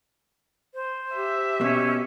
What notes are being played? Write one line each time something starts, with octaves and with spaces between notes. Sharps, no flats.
C5
G4 E5
B2 C#4